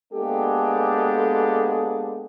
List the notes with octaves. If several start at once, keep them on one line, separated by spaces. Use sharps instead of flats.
G#3 A#3 B3 D4 G4 A4